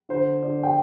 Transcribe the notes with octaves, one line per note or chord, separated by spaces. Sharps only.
D3 C5
D3 D5
G5